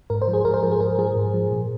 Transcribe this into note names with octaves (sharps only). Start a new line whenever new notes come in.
G#2 A#4
C5
F3
G#4
G#2 A#4
C5
F3 A#4
G#4
G#2 A#4
F3 G#4
G#2
F3
A#2